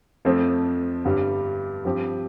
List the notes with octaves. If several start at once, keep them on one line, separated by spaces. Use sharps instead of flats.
F2 F3 A3 C4
G1 G2 G3
G2 F3 C4 G4